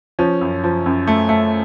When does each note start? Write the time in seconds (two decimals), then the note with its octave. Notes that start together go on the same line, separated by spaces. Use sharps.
0.19 F3 C#4
0.41 F#2
0.64 F3
0.86 F#2
1.07 A3
1.29 A3